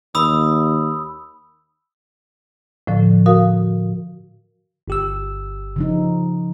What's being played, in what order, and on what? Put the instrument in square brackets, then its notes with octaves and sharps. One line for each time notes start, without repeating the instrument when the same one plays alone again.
[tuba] D#2 [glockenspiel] B5 D#6 E6
[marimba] A2 D3 F3
F#4 A#4 F5 D#6
[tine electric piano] G1 G4 E6
[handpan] C#3 F3 D#4